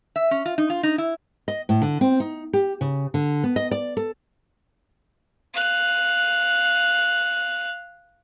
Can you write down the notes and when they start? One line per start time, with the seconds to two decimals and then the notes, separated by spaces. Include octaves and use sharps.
0.16 E5
0.31 C#4
0.46 F4
0.58 D#4
0.70 F4
0.83 D#4
0.98 E4
1.48 D#5
1.69 A2
1.82 D3
2.01 C4
2.20 D#4
2.53 G4
2.81 C#3
3.14 D3
3.44 B3
3.56 D#5
3.71 D5
3.97 A4
5.54 F5 F#6